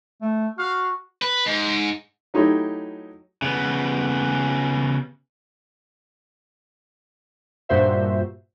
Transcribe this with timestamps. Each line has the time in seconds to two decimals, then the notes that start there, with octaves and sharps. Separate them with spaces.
0.22 A3
0.58 F#4 F5
1.22 B4
1.46 G#2
2.34 F#3 A3 D#4 E4 G4 C#5
3.42 C#3 B3
7.69 G2 A#2 F#4 C5 E5